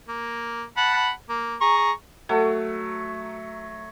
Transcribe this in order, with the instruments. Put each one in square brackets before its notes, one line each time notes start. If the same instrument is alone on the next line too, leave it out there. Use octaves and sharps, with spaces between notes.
[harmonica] A#3
F#5 A5 B5
A#3
G#4 A#5 C#6
[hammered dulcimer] F#3 A3